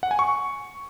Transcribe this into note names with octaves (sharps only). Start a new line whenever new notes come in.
F#5
G#5
C#6